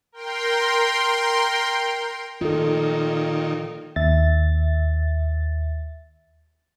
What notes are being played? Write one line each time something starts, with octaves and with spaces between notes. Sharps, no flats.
A#4 G5 C6
A#2 D#3 F4 A4
D#2 E5 A6